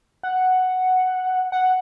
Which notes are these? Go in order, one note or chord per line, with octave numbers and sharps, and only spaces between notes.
F#5
F#5